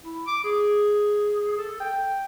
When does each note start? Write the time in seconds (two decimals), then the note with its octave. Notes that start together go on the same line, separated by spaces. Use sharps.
0.04 E4
0.27 D6
0.44 G#4
1.58 A4
1.80 G5